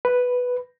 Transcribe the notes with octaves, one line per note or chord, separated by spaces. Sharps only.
B4